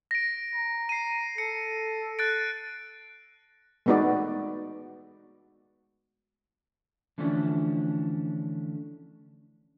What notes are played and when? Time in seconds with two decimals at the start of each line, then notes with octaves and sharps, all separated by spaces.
0.11 A#6 D7
0.56 A#5
0.89 C7 D#7
1.38 A4 C#7
2.19 F#6 A6 D7
3.86 G#3 A3 B3 D#4 F#4 D5
7.18 D3 E3 F3 A3 C#4 D4